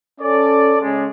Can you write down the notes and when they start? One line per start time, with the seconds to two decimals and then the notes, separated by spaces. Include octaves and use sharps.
0.20 C#4 A4 D5
0.81 C#3 G#3